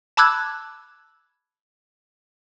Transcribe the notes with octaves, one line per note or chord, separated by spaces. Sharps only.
A5 B5 D6 E6 F#6 G#6